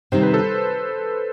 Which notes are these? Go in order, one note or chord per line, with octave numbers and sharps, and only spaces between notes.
C3 D#3 G3 D#4 C5
B4
A4 C5